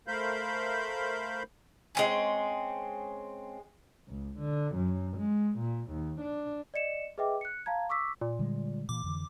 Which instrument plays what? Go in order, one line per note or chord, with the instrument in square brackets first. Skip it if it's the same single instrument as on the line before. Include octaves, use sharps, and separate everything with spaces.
[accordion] A3 A#4 C5 F5 B5 G6
[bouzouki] G#3 C4 C#4
[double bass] C#2
D3
F#2
G#3
A#2
D#2
D4
[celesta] D5 D#5 C#7 E7
G#4 B4 D#5 E5 G5 D6
F#6 C#7
F5 A5 A#5 G#6
C#6 D6 E6 B6
[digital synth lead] A#2
[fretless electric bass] D3 G3 G#3
[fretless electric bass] A#2 E3 [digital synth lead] D6
[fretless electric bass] F2 D3 E3